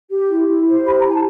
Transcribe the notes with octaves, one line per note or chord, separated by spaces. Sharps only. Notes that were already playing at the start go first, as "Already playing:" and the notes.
G4
E4
E4
C5
G4 B5
A#5
E4 G#5
A5